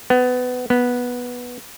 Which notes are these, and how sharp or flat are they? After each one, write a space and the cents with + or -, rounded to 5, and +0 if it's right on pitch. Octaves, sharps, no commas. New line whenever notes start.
B3 +20
B3 -10